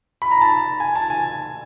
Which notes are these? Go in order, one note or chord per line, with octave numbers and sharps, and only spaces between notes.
B5
A#5
A5
G#5
A5
G#5